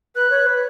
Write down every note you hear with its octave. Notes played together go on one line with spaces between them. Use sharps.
B4 F#6
C#5
B4